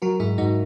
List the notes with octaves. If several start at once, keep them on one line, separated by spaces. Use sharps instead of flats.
F#3 F#4 A#4
G#2 E4 G#4
G#2 D#4 F#4